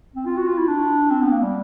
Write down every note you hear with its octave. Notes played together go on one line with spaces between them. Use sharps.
C4
F4
F#4
F4
E4
D4
C4
B3
A#3
G3